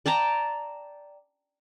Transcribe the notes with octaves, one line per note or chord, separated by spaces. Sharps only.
D5 G5 A5 A#5